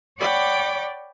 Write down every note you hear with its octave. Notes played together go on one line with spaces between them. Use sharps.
C#5 D5 F#5 G5 B5 D6